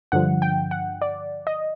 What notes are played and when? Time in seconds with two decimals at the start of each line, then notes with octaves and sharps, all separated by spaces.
0.12 G2 D3 F3 F#5
0.42 G5
0.71 F#5
1.02 D5
1.47 D#5